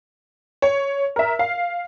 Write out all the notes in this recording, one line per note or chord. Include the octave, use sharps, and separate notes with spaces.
C#5
A#4 E5
F5